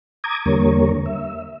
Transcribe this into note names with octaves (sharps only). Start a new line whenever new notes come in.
A#5 D6 D#6 G#6
E2 D3 G3 A#3 A#4 C#5
E5